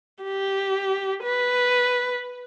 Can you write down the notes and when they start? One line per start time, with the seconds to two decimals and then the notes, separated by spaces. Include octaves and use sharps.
0.23 G4
1.23 B4